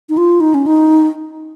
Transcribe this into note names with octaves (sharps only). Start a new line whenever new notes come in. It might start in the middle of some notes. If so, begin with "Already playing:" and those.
D#4
F4
D#4
C#4
D#4